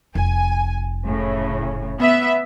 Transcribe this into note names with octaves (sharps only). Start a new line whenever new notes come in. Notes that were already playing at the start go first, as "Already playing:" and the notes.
F1 G#5
A2 C#3
B3 E5